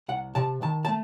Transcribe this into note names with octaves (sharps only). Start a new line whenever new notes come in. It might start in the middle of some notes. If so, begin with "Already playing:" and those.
C2 F#5
C3 A5
D#3 A5
A5
A3